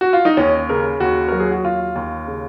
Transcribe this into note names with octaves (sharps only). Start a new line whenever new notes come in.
F#4
F4
D#4
D#2 C#4
C#3 A#4
D#2 F#4
F#3 A#4
G#4
F#4
D#2 F4
D#2
C#3